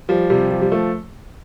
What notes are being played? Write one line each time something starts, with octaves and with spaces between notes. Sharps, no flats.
F3 G3
C3 G3
F3
G3
F3 A3